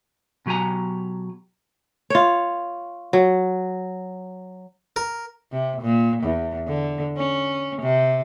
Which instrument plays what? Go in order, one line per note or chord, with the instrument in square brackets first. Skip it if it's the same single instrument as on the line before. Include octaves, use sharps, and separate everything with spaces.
[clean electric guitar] B2 F#3 G4 G#5 A#5
[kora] F4 C#5
F#3
[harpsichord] A#4
[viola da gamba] C3
A#2
E2
D3
C#4
C3